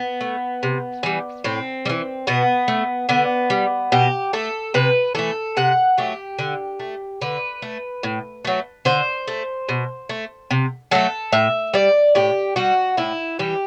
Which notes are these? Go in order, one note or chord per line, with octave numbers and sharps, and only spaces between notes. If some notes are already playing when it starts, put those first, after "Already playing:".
Already playing: B3
A3
C3
E3 G3
A2 C4
G3
E3
B2 B3
A3
D3 B3
G3
B2 G4
A3 A4
C3 B4
E3 A3 A4
C3 F#5
F#3 A3 G4
D3
A3
D3 B4
A3
A2
F#3 A3
D3 C5
A3
B2
A3
C3
F#3 A3 A4
A2 E5
G3 D5
A2 G4
G3 F#4
A2 E4
E3 G3 G4